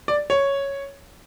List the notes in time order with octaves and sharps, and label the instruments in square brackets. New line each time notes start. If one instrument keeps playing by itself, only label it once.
[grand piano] D5
C#5